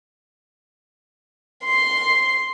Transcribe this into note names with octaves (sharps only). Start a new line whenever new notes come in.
C6